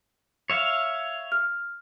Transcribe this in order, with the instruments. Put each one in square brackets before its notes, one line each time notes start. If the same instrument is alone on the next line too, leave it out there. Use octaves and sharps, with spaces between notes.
[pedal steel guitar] C#5 E5 F5
[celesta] F6